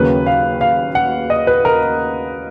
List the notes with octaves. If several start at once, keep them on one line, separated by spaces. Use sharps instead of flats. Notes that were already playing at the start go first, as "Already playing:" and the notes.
Already playing: D#2 C#3 F#3 A#3 B4
F5
F5
F#5
D#5
B4
A#4